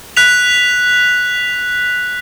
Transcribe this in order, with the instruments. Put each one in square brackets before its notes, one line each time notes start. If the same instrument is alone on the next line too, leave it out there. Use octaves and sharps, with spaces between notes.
[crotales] F#6 B6 F7